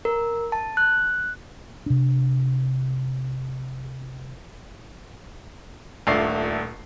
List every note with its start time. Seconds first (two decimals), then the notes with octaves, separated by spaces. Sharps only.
0.05 A#4
0.52 A5
0.77 F#6
1.86 C3 D4
6.07 D#1 A#1 A3 D5 C7